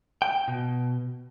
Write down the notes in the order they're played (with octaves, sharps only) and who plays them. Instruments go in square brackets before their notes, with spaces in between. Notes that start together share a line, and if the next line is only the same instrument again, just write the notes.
[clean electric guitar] G5
B2